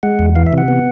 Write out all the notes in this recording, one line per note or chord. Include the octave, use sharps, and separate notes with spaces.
G#3 F#5
E2
E3 F5
E5
C3 F#5
B3